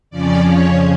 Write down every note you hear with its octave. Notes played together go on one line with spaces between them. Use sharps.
F2 C#3 F3 C#4 D5
C#5